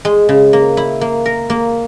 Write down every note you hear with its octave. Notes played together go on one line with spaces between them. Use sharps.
G#3
C#3
A#3
E4
A#3
A#4
A#3